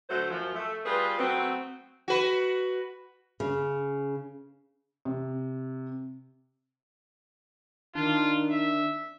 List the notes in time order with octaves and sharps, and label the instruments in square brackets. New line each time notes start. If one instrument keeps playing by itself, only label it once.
[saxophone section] D2 F#3 A3 C5
F#2 F3
A3
G3 F4 G#4 B4
F#3 A3 B3 C4
[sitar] F#4 B4
[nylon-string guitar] C#3
[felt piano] C3
[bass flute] D#3 [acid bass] D4 [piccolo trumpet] F4
[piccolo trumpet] E5